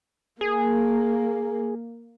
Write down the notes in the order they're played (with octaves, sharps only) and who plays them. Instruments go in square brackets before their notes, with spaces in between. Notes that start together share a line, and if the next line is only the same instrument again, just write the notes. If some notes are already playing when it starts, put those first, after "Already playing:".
[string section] A#3 [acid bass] G#4